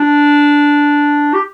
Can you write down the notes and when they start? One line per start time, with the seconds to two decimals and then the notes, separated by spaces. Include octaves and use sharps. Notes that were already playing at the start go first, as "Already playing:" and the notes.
Already playing: D4
1.34 G4